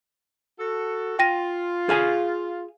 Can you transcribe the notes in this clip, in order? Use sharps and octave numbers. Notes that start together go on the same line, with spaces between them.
F#4 A4
F4 G5 A#6 D#7
G#4 F5 G#5